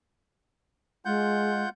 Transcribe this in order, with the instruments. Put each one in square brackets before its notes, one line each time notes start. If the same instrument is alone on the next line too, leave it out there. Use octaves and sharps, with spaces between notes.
[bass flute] G#3 [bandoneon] F4 F#5 G6